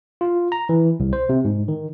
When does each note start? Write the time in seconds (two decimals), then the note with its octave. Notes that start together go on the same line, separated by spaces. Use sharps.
0.21 F4
0.52 A#5
0.69 E3
1.00 C2
1.13 C5
1.29 C3
1.45 G#2
1.68 D#3